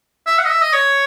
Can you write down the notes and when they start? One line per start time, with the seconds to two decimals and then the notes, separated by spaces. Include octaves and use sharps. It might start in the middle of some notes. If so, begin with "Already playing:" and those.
0.26 E5
0.38 F#5
0.45 D#5
0.50 E5
0.62 D#5
0.73 C#5